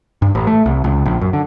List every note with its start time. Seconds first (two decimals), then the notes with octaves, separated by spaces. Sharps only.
0.22 G2
0.35 A1
0.47 A3
0.66 C2
0.84 C#2
1.06 A#1
1.21 F#2
1.33 D3